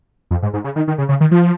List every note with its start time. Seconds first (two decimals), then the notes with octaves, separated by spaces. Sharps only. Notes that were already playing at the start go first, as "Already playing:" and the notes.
0.31 F2
0.43 G#2
0.53 G#2
0.64 C#3
0.76 D#3
0.88 D#3
0.98 C#3
1.09 C#3
1.21 D#3
1.31 F3